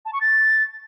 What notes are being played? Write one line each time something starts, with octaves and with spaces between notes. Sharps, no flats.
A5
C#6
A6